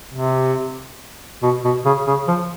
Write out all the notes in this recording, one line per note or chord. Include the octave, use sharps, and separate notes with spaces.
C3
B2
B2
C#3
C#3
F3